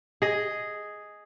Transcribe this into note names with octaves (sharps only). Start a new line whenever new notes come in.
G#4 D#5